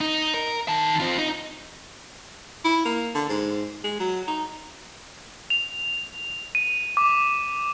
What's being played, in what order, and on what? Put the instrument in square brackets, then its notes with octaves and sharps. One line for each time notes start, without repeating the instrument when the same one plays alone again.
[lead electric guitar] D#4
A#4
D#3 A5
C4 F4
D#4
[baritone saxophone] E4
A#3
D3
G#2
G#3
F#3
D#4
[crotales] F7
D#7
D6